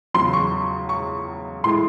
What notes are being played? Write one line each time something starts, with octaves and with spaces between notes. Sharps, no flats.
E2 C#3 F#3 C6
C#6
C#6
A2 E3 G#3 C6